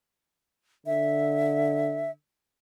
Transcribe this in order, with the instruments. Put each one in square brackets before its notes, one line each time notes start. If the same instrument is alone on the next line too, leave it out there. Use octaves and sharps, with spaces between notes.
[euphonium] D3 [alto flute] E5